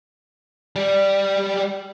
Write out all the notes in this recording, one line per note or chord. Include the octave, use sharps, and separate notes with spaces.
G3 D5